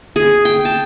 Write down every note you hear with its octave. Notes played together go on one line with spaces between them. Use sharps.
G#4
G5
A5